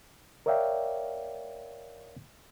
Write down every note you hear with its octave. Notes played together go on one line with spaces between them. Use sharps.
A#4 C#5 D5 E5 F5 G5